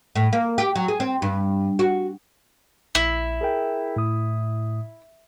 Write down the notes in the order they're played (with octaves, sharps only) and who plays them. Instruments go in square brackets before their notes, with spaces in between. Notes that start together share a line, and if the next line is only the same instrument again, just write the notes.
[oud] A2
A#3
G4
F#3
G#4
C4
G2
F#4
[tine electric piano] A#1 [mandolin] E4
[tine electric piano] G#4 A#4 G5
A2 D#6